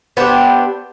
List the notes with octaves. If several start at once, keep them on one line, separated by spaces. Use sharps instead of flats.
B3 C4 D4 G4